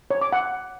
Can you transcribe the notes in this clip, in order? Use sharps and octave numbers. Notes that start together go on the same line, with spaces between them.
C#5
D6
F#5